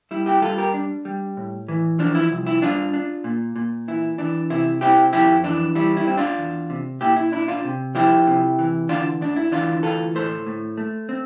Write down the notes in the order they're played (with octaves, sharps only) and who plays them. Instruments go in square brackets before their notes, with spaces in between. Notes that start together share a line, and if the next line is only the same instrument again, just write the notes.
[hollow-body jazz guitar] G3 E4
E4 G4
G3 F4 A4
G4 A#4
D4
G3
A2
E3
F3 D4
E4
C2
E4
G2 D4 F4
D4
A#2
A#2
E3 E4
E3 D4
C3 E4
C4 E4 G4
F2 E4 G4
E3 D4
G3 E4
E4
C4
D4 F4
E2
C3
A#2 E4 G4
E4
D4 E4
D4 F4
C3
F3 E4 G4
C3
E3
D3 D4 F4
D2 D4
E4
E3 D4 F4
D2 F4 A4
A2 A4 C5
A2
A3
C4